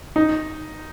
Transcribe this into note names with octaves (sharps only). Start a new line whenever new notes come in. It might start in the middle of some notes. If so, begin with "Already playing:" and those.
D#4